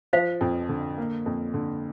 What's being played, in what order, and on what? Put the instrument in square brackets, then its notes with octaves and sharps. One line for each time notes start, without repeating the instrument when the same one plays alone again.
[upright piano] F3 [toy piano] C5 F5
[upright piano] F2
D3
A#3
F2
D3